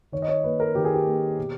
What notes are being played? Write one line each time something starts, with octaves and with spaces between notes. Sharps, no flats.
D#3 C#5
D#5
C#5
A#3 B4
A#4
D#3 G4
G#4
G4
A#3
B2